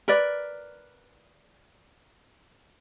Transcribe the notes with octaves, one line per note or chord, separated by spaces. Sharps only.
A#4 B4 D5